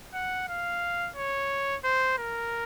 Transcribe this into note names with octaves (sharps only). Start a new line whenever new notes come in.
F#5
F5
C#5
C5
A#4